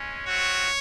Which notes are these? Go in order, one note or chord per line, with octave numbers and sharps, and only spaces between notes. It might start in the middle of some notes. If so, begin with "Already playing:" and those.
Already playing: G#3 C#4
A3 C4 F#4 C#5